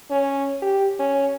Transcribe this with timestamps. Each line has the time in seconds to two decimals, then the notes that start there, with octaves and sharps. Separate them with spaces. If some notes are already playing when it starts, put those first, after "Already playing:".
0.11 C#4
0.62 G4
0.99 C#4